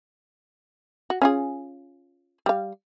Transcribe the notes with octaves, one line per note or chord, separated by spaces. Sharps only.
F#4
C#4 F4 G#4
G3 F5